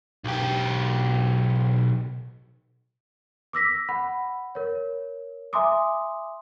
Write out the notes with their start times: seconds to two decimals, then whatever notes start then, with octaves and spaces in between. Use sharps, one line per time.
0.24 B1 G4
3.53 D6 E6 A#6 B6
3.89 F#5 B5
4.55 A#4 C#5
5.53 E5 G#5 A#5 C6 D6 D#6